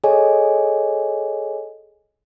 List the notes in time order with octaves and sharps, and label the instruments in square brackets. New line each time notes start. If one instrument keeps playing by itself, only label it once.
[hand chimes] G#4 A4 C#5 D#5 G#5